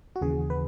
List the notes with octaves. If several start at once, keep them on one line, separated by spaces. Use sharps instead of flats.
F#4
D#2 C#3 E3 G#4
B4